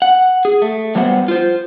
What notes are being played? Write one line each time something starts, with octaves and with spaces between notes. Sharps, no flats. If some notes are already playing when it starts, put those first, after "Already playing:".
F#5
G#4
A3
F#3 G3 B3 C5 F#5
F4 C5